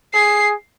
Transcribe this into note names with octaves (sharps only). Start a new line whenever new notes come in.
G#4 C7